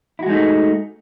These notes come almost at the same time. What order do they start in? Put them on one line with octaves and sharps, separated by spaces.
E4 F#4 G#3 D#4 A3